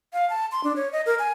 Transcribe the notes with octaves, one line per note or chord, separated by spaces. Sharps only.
F5
A5
C6
D4
C#5
D#5
A#4
G#5